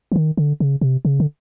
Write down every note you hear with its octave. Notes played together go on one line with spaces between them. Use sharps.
E3
D#3
D3
C#3
C3
C#3
D3